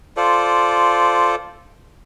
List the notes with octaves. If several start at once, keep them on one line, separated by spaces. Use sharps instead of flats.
F4 A4 C5 D5